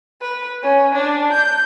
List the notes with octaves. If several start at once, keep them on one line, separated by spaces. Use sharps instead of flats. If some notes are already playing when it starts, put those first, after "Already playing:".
B4
C#4
D4
G6